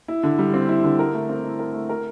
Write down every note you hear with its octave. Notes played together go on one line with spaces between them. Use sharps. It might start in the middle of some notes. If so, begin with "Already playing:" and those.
E4
D3
G3
C4
E4
D3
A#4
A3
C4
E4
A#4
A3
A#4